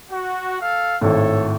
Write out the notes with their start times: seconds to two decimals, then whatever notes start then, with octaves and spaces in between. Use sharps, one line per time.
0.12 F#4
0.61 A4 F5
1.01 G#1 A2 A4 C#5